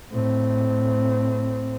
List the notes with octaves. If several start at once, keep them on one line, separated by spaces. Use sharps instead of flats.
A2 C4